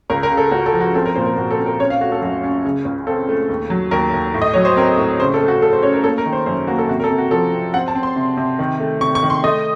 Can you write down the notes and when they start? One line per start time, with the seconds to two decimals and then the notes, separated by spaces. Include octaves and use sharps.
0.10 C#2 A#4
0.23 A#4
0.31 C#3
0.37 A4
0.51 C#2 F#4
0.66 A4
0.73 F3
0.81 F#4
0.95 C4 A4
1.05 A#4
1.16 A#2 C5
1.26 A#4
1.37 A#2 F#4
1.51 A4
1.59 C4
1.66 A#4
1.79 C#4 C#5
1.90 F5
2.00 A3 F#4
2.12 A4
2.21 F#2 F#4
2.44 C#4
2.65 C#3
2.85 C#2
3.07 C4 A4
3.29 A3
3.49 D#2
3.70 F#3
3.91 D#2 A#4
4.14 D#2
4.34 A2
4.42 D#5
4.54 F#3 C#5
4.65 C5
4.76 C4 A#4
4.97 A2
5.19 C#3 C5
5.34 A4
5.40 A3
5.48 F#4
5.62 A3 A4
5.73 C5
5.83 C#4 C#5
5.94 A#4
6.04 A#3 A4
6.18 A#4
6.26 D#3
6.33 C5
6.46 F#2 C5
6.67 A#3 F#4
6.78 A4
6.89 C3 F#4
7.00 A#4
7.04 A4
7.10 C3
7.18 F#4
7.31 F3 A4
7.52 C4
7.74 C4 F#5
7.88 A5
7.95 C4
8.03 C6
8.16 C3
8.37 C3
8.59 D#3
8.80 A3
9.01 C3 C#6
9.15 C#6
9.23 D#3
9.30 C6
9.44 A3 D#5